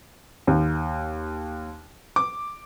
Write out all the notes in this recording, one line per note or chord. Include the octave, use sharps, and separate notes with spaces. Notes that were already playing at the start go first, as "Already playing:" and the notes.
D#2
D6